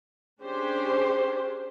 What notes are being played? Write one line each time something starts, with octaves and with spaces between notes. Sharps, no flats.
C#4 D4 G4 G#4 C5